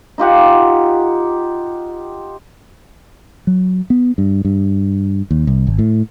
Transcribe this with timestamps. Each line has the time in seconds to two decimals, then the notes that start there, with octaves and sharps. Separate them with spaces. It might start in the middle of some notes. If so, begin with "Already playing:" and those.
0.18 D#4 F4 G4 F#5
3.47 F#3
3.90 B3
4.18 G2
4.45 G2
5.31 D#2
5.47 C2
5.67 G#1
5.78 A2